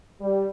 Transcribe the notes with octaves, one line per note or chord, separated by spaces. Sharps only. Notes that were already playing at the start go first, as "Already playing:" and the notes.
G3